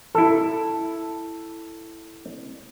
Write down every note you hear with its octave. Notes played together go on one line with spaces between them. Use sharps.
E4 A4